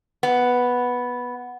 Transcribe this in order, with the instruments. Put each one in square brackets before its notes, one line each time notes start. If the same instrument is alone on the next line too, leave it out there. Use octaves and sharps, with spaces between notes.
[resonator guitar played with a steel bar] B3